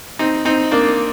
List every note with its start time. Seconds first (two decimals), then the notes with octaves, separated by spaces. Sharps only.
0.19 C4 D#4
0.45 C4 D#4
0.71 A#3 D4